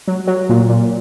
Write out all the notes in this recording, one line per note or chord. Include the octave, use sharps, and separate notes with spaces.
F#3
F#3
A#2
A#2